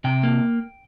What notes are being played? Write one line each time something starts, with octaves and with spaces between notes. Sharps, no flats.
C3 G5
A#3